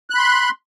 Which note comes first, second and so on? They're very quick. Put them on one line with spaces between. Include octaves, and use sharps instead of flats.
F#6 B5 C6